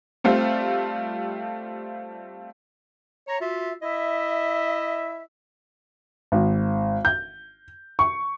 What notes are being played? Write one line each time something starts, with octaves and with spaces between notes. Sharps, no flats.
G3 A3 C4 F4
C#5 A#5
F4 F#4 E5
E4 D#5 E5
G#1
G6
C#6